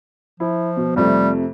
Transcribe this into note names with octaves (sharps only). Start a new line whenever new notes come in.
F3 E4
B2
F2 C3 G3 A3